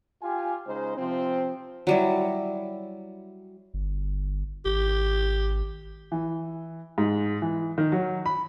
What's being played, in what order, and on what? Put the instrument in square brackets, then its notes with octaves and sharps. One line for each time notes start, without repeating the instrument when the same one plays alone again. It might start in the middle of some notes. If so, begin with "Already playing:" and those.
[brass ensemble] F4 G4 G#5
C#3 G#3 D#4 C5
C3 F3 C4
[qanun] F#3 G3 E4
[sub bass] G1
[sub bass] G#1 [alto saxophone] G4
[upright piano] E3
G#2
E3
D#3
F#3
B5